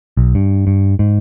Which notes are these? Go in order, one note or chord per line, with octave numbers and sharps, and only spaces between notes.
B1
G2
G2
G#2